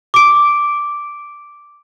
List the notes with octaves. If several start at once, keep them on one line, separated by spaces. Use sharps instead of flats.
D6 D7